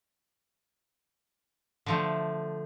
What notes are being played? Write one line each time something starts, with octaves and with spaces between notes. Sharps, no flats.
D3 F3 A3